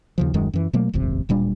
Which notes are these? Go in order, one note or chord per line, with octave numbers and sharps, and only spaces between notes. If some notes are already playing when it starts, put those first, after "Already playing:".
D#2 C#3 F3
D#1 F#2 D#3 G#3
F#2 E3
B2 F#3 A3 A#3
D#1 G#1 F2 C3
D1 A#2 G3 D4